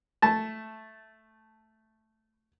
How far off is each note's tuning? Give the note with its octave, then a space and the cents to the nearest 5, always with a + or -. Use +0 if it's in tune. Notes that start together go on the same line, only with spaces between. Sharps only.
A3 +0 A5 -5